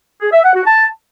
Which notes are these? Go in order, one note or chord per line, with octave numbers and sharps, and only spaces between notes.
G#4
E5
F#5
F#4
A5